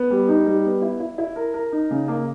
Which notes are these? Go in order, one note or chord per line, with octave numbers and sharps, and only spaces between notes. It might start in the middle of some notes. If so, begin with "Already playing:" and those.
Already playing: B3
G3
D#4
G3
B3
E4
E4
E4
A#4
A#4
D#4
C#3
A#3